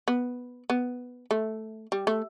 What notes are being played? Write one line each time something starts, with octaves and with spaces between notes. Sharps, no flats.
B3
B3
A3
G3
A3